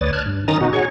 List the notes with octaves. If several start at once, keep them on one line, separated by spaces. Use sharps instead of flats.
D2 B4 C#5 D5 D#6 A6
A5 F6 F#6 G#6
G2
D#3 C#4 D#4 A#5 D#6 A6
B2 D#4 F#4
F#4 G#4 C#5 C#6